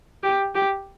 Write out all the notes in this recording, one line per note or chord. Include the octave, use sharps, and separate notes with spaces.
G4
G4